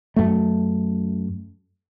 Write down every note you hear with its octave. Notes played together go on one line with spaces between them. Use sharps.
F#2 A3